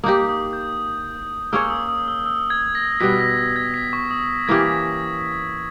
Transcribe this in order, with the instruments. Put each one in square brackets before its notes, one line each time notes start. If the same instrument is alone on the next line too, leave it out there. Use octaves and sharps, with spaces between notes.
[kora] A#3 D#4 G4 [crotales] D#6
[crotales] D#6
G6
[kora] A#3 C#4 G#4 C#5 [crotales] E6
[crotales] D#6
D#6
E6
E6
G#6
A#6
[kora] B2 G3 B3 [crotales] B6
[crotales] A#6
A#6
G#6
B6
C#6
D#6
[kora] E3 A#3 C#4 G4 [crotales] G#6
[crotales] B6